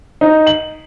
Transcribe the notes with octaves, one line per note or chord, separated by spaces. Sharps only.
D#4
F#7